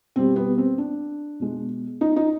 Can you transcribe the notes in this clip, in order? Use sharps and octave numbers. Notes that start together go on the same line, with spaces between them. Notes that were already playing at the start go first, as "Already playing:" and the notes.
B2 G3 C4
B3
C4
D4
B2 G#3
D#4
D#4